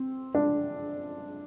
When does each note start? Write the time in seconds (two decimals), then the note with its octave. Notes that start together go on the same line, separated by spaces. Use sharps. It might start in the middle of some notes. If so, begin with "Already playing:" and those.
Already playing: C4
0.35 D4